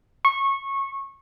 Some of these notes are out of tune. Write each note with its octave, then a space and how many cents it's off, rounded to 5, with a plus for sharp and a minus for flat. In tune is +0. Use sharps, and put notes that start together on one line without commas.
C#6 -20